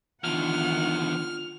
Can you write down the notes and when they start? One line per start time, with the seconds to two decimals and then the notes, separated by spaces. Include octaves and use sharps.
0.24 E2 D3 D#3 F4 F#5 F6